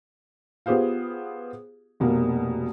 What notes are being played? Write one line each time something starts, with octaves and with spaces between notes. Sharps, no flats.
B3 F4 G4 G#4 C5 F5
F1 B2 A#3